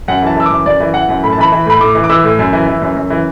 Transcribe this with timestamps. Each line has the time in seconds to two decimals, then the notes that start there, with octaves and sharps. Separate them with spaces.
0.08 F#2 F#5
0.22 E3 A5
0.36 E3 E6
0.46 F#2 D6
0.66 F#2 D5
0.80 E3
0.94 E3 F#5
1.09 F#2
1.23 A2 B5
1.33 A5
1.38 E3 B5
1.52 E3
1.66 A2 B5
1.81 A2 D6
1.95 E3
2.04 D6
2.09 E3 E6
2.24 A2
2.39 F#2
2.53 E3
2.67 E3
2.82 F#2
2.96 F#2
3.10 E3